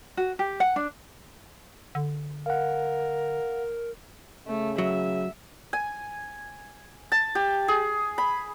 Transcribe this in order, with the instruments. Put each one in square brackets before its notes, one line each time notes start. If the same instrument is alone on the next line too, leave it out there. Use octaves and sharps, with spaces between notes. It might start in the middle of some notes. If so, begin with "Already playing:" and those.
[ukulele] F#4
G4
F#5
D4
[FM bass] D3
[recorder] A#4 [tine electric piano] F5 F#5
[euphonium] C#3 [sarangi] A3
[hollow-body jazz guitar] F#3 [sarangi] E5
[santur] G#5
A5
G4
G#4
B5